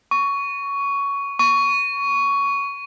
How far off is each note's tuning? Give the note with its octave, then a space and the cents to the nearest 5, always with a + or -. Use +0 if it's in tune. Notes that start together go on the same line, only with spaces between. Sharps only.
C#6 +15
C#6 +15